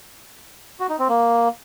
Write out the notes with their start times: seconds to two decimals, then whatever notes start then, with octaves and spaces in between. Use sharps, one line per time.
0.80 F#4
0.89 D#4
0.99 C4
1.09 A#3